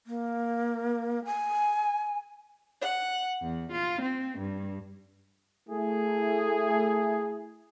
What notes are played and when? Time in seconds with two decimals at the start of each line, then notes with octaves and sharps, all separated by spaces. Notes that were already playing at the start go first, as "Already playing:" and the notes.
0.07 A#3
1.25 G#5
2.81 F#5
3.42 E2
3.72 F4
4.02 C4
4.38 G2
5.69 A3 E4 G#4